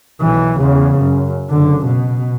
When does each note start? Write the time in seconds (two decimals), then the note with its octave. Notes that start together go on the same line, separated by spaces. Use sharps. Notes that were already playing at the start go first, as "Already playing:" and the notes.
0.20 B1 E3
0.58 E2 C#3
1.00 F#2
1.50 F#1 D3
1.86 B2